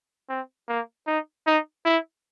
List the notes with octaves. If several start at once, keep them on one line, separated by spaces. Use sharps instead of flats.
C4
A#3
D#4
D#4
E4